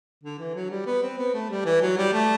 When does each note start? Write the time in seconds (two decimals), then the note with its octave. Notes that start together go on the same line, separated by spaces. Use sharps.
0.24 D3
0.39 E3
0.55 F#3
0.71 G3
0.86 B3
1.03 C4
1.18 B3
1.34 A3
1.50 G3
1.66 E3
1.82 F#3
1.98 G3
2.13 A3